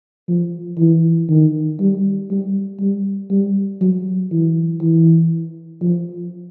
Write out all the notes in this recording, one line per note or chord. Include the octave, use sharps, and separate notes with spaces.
F3
E3
D#3
G3
G3
G3
G3
F#3
E3
E3
F3